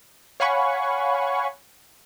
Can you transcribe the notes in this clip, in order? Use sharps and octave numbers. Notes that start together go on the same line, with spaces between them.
C#5 F5 F#5 G#5 B5 C#6